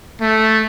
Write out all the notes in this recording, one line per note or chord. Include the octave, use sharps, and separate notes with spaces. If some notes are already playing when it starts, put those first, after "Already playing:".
A3